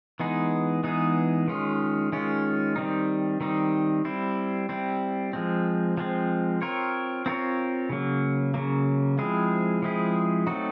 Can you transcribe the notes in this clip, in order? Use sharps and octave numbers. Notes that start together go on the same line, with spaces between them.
E3 G#3 B3 D#4 G#4
E3 G#3 B3 D#4 G#4
D#3 G#3 C#4 F4
D#3 G#3 C#4 F4
D#3 G3 C4 D#4
D#3 G3 C4 D#4
G3 C4 E4
G3 C4 E4
F3 G#3 C4
F3 G#3 C4
C4 F4 A#4 C#5
C4 F4 A#4 C#5
C#3 F#3 A#3
C#3 F#3 A#3
F3 G#3 C4 E4 G#4
F3 G#3 C4 E4 G#4
F#3 A3 C4 D#4 F#4